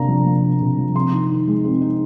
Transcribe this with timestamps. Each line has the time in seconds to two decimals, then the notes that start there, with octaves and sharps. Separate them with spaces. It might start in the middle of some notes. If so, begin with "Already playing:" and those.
Already playing: C3 A#3 D4 A#5
0.08 F3
0.26 A#3
0.44 D4
0.61 C3
0.78 F3
0.95 C4 C6
1.12 D#4
1.30 D#3
1.47 G#3
1.65 C4
1.81 D#4